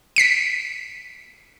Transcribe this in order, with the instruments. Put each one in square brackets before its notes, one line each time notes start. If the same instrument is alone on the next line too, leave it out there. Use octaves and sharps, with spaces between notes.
[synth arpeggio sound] B6 C7 D7